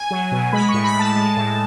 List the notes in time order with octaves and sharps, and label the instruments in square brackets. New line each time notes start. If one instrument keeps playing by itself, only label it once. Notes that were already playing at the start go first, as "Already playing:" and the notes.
Already playing: [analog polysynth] G#5
F#3
B2
G#3 B5
C#6
A2
B5
G#3
A5
G#3
A2